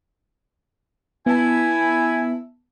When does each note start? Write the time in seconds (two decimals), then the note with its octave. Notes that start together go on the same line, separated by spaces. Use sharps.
1.26 B3 E4 G#5 A5